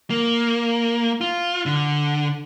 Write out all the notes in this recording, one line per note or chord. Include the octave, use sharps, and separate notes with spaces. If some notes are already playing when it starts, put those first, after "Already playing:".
A#3
F4
D3